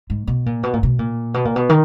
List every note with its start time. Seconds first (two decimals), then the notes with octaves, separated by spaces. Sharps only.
0.10 G#2
0.27 B2
0.46 A#2
0.63 B2
0.73 A#2
0.83 B2
0.99 A#2
1.34 B2
1.45 A#2
1.56 B2
1.69 D#3